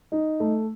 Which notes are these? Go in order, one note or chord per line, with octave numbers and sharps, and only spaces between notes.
D#4
A3